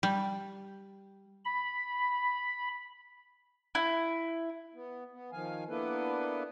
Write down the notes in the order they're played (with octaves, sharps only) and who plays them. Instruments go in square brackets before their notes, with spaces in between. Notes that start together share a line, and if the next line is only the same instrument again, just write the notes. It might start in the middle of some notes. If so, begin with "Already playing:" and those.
[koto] G3
[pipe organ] B5
[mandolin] E4
[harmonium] B3
B3
D#3 F3 F5 G#5
A#3 B3 D4 E4 A4 B4